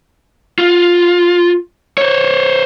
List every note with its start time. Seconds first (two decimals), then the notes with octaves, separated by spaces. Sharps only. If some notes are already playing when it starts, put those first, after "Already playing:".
0.58 F4
1.98 C5 C#5